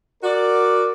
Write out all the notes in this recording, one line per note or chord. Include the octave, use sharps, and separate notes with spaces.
F#4 A#4 D5